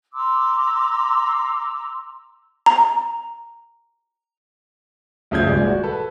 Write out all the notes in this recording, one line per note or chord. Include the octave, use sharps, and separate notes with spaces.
A#5 C6 D6 E6
A#5
D2 G2 C#3 F3 G6 G#6
D#1 G3 G#3 D5 G6
F#4
A4 B4